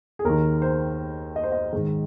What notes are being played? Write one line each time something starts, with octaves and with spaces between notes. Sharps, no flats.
G#4
D#2 D#3 A#4
C5
D#5
C5
D#5
G#2 D#3